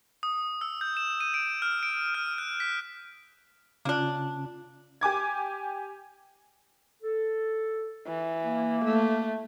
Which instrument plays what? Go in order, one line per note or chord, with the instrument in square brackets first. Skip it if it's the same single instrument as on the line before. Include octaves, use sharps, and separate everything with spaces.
[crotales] D#6
E6
G6
E7
D#7
D7
F6
D7
F6
F#6
B6
[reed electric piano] C#3 C#4 F4 [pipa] A#3 D4
[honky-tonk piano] G4 G#5 D6 G#6
[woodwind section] A4
[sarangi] E3
[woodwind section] A#3
[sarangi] A3